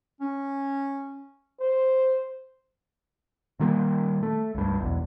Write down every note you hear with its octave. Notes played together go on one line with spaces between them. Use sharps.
C#4
C5
A#2 D#3 G3 A#3
A3
C#2 G2
B1 E2